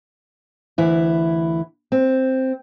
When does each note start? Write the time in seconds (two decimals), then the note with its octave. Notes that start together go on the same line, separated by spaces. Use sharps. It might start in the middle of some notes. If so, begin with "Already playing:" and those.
0.78 D2 E3 E4
1.92 C4